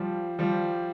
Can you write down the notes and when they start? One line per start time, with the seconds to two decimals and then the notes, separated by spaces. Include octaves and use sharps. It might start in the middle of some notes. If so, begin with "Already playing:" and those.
Already playing: F3 G3
0.39 F3 G3